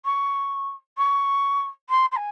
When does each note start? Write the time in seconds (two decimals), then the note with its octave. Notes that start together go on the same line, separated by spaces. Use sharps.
0.05 C#6
0.98 C#6
1.89 C6
2.11 C6
2.16 G#5